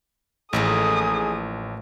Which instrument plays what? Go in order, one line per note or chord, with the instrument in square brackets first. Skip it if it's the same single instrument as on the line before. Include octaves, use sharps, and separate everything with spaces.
[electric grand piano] A1 [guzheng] A2 F3 A#3 [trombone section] D#4 G#4 [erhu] D#6